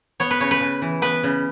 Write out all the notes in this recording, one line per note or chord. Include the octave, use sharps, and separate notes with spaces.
B3 C#5
B4
C#3 C#5
B4
C#3
E3
B3 B4
C#3